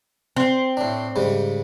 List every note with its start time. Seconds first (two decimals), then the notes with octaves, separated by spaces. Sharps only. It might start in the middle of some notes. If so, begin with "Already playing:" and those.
0.36 C4
0.77 A2 D4
1.16 G#2 C#3 G3